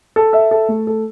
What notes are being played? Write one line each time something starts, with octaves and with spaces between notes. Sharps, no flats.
A4
E5
A4
A3
A4